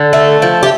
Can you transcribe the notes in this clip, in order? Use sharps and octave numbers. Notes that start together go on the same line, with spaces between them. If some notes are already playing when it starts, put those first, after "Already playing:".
Already playing: D3
A3
F3
G4